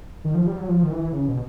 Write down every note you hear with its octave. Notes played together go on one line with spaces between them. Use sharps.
D#3
F3
G3
F#3
F3
D#3
E3
C#3
B2